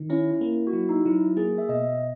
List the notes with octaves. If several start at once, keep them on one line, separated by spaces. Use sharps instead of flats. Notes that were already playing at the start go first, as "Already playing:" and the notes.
Already playing: D#3
C#4 E4
E4
A#3
F#4
F#3 E4
D#4
F#3 E4
A#3 G#4
E5
B2 D#5